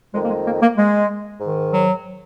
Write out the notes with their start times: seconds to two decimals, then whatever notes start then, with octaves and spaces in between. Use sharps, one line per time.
0.13 F2 D#3 G#3
0.24 A#3
0.29 G#3
0.45 A#3
0.61 A#3
0.77 G#3
1.41 G#2 D#3
1.73 F#3